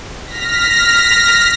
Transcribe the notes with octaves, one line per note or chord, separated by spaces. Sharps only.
F6 A#6 B6